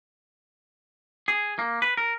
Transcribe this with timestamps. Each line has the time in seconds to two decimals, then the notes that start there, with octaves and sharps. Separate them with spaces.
1.28 G#4
1.59 A#3
1.82 B4
1.97 A#4